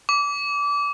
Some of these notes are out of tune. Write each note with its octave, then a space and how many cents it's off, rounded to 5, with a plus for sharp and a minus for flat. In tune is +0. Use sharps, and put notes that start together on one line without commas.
D6 -25